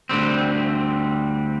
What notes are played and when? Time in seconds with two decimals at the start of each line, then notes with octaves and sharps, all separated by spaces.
0.09 D2 D3 G3 C4